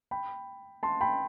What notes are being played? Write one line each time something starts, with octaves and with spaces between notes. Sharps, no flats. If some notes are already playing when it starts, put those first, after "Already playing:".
G5 B5
A5 C6
G5 B5